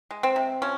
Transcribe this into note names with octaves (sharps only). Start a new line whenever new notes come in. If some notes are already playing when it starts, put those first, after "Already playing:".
G#3
C4
C3
F3 C#4